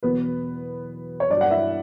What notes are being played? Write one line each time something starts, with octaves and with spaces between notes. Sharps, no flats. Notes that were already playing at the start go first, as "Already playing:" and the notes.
E2 B2 F#3 B3 B4
C#5
G2 F#3 D4 D5
F#5
E4 E5